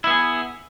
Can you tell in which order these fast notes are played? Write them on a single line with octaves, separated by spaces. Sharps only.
E4 B3 G#4